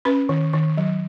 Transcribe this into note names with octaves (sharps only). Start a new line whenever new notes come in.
C#4 B4
D#3
D#3
F#3